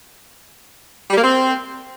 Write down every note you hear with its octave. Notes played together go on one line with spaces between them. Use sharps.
G3
A#3
C4